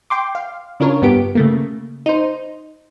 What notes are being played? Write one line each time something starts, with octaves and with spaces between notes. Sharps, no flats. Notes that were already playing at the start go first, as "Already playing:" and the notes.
G5 C6 D6
F5
C#3 D4 F4 A#4 C#5
G2 B3 G4 D7
C#3 A3 A#3
D#4 C5